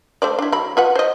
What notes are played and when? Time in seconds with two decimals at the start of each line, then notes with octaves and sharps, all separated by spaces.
0.22 A3 C5 D5
0.39 D4 E4
0.52 F#3 B5
0.77 F4 B4 F#5
0.95 C5 D#5